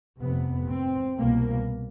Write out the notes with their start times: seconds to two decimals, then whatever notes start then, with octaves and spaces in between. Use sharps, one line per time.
0.20 F1 F2 C3 B3
0.70 C4
1.19 C2 B2 A#3